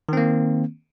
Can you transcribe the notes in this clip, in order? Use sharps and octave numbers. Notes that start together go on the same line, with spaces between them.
D#3 A#3 C4